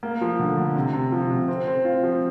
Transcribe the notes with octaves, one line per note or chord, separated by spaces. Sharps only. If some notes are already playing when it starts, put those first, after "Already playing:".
A#3
F3
D3
D3
C3
C3
F3
C3
C4
C4
F4
F3